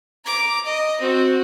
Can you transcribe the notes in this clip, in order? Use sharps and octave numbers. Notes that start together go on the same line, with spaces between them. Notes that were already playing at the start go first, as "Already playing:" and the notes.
A#5 D6
D#5
C4 F#4